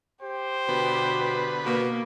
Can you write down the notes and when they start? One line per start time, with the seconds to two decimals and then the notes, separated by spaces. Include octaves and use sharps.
0.22 G4 C5
0.69 B2 D3 B3 B4
1.65 B2 A#3